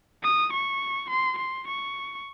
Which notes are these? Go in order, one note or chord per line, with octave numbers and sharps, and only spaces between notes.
D#6
C#6
C6
C6
C#6